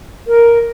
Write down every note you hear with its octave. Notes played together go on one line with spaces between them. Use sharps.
A#4